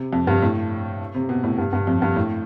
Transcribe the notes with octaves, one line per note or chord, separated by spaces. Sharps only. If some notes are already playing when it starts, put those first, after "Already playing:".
Already playing: C3
F2
G2
A2
C3
B2
A2
G2
G2
F2
G2
A2